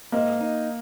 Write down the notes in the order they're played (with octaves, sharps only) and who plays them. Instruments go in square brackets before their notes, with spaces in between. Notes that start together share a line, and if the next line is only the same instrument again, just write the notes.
[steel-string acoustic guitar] G#2 [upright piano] A#3
[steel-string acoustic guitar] D#4